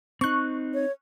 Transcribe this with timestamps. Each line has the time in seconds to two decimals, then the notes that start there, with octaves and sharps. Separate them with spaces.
0.21 C4 D#4 C#6 F#6
0.74 C#5